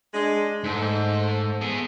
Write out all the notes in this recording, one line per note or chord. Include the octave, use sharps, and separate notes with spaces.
G#3 D4
G#2 A3 A4 C5
B3 G#4